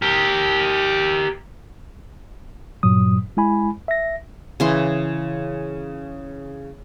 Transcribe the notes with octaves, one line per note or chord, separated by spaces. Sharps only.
G4 A#4
G2 A#2 F#3 D#6
G#3 E4 G#5 B5
E5 A#6
C#3 E3 C6